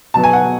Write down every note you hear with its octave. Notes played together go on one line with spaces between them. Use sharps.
B2 F#3 B3 A5
G#5
F#5
B2